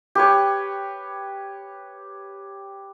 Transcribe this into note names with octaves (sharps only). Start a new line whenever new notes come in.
G4 B4 C#5